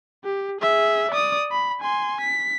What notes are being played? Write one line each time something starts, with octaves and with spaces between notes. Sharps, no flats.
G4
G#4 E5
D5 D#6
B5
G#5 C6
B6